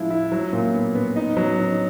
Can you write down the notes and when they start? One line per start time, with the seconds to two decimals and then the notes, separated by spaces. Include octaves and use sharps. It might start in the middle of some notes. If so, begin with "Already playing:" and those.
Already playing: F3 G#3 E4
0.10 E4
0.32 F#3
0.53 A#2
0.74 B3
0.95 B3
1.16 D#4
1.37 F#3
1.58 D#4